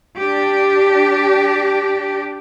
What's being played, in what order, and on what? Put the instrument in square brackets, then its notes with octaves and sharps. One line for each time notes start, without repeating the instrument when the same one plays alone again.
[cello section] D4 G4